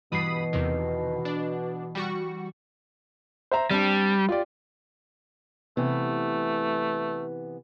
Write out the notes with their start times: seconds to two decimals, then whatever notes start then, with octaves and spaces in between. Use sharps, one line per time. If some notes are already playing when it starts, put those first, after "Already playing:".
0.12 G2 B2 E3 B5 D#6 C7
0.53 E2 C3 D#3
1.25 D4
1.95 G3 F#4 C#6
3.51 C5 E5 A#5
3.71 G3 C4 D4
4.29 F4 G4 D5
5.77 C3 E3 A3 B3